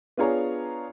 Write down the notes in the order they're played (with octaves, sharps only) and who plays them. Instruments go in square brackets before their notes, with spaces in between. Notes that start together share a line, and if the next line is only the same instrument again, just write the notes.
[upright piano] B3 D4 F4 G#4 C#5 A#5